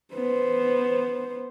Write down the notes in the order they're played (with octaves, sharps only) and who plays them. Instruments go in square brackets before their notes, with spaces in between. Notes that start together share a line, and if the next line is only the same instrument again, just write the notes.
[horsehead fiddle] B3 C5